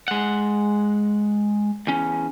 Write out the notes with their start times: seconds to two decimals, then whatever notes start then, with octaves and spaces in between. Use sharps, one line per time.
0.08 G#3 F#5
1.87 E2 C#4